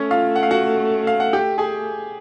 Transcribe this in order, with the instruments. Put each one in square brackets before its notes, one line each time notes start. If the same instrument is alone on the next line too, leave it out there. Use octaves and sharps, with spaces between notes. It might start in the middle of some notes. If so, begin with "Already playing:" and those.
Already playing: [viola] A3 [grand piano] C#4 C#5
[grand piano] F4 F5
F#5
F5
F#4 F#5
F5
F#5
G4 G5
G#4 G#5